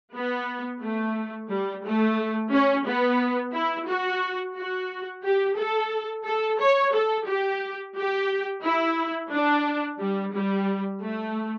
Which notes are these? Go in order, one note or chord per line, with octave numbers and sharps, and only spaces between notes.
B3
A3
G3
A3
C#4
B3
E4
F#4
F#4
G4
A4
A4
C#5
A4
G4
G4
E4
D4
G3
G3
A3